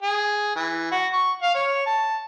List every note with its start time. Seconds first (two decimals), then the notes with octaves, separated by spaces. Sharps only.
0.03 G#4
0.56 E3
0.92 F#4
1.13 C#6
1.42 F5
1.54 C#5
1.86 A5